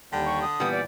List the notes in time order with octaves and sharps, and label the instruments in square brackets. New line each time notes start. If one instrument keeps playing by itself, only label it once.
[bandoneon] D#2 G3 G5 [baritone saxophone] D3
[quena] C#6
D#6
[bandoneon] A#2 E3 [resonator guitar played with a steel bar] G3 B3
[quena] D5